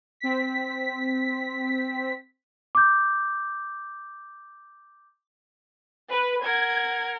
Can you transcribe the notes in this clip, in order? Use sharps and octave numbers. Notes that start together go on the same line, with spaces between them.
C4 B6
D6 G6
B4
A#4 F#5 G#6